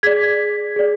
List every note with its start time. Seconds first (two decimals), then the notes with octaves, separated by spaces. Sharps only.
0.03 G#4 D5 G#6 B6
0.76 G#4 D5